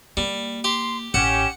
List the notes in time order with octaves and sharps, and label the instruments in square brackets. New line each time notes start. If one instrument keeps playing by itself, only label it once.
[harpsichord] G3 [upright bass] A#3
[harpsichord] G4 [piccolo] C6
[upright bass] A1 [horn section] C#4 G4 [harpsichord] F#5 [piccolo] E7